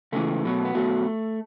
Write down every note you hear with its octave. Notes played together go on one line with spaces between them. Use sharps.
C#2 C#3 E3 A3
B1 B2 F#3
B3
B2 F#3 A3